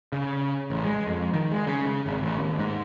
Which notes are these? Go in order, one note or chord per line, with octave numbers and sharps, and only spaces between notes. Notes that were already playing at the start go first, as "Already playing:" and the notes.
C#3
A1
G#3
F2
D#3
G#3
C#3
C#3
G#1
A1
D#2
G#2